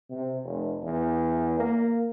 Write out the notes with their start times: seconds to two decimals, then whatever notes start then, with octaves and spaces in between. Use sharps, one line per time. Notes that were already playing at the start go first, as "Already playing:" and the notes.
0.10 C3
0.44 F1
0.83 E2
1.59 A#3